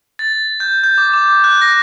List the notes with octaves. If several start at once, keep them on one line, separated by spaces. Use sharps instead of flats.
A6
G6
G6
D6
D6
F#6
A#6